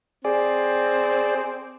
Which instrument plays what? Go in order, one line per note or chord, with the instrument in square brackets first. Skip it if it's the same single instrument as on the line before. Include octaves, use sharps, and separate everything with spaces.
[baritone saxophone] C4 [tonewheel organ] G#4 D5